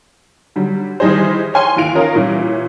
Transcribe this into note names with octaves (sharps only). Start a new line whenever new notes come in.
D3 F#3 G3
D#3 E3 G3 D#4 G#4 C5
C#5 G#5 C6
D#2 E3 F4 D7 F7
C#4 D#4 F4 A#4
A#2 E3 G3 C#4